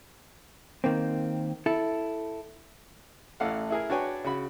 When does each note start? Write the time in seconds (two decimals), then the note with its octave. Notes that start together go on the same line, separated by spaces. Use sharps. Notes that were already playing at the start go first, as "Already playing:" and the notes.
0.84 D#3 A#3 C4
1.66 E4 A4
3.40 A1 E4 A4 F5 F#5
3.70 E4 G#4 A#4
3.90 D4 F#4 B4 C#5 G5 G#5
4.24 C#3 F#4 B5